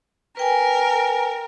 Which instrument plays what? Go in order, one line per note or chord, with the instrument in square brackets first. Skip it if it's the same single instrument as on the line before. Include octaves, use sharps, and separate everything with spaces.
[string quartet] A#4 [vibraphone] B4 G5 G#5